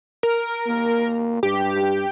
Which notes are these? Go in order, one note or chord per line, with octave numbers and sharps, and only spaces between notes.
A#4
A#3
G2 G4